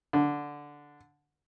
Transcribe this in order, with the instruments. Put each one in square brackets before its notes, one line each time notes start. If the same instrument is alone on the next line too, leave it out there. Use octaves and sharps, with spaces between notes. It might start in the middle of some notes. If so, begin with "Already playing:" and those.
[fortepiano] D3